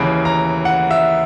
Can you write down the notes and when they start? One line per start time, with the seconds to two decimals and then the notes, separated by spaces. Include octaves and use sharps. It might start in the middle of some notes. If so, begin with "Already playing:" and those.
Already playing: D#2 C#3 E3 B5
0.25 A#5
0.65 F#5
0.91 E5